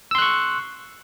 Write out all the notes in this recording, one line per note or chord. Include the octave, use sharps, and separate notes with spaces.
C6 C#6 E6 F#6